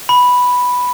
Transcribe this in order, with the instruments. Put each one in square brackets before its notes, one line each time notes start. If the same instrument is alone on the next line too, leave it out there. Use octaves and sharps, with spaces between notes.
[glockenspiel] B5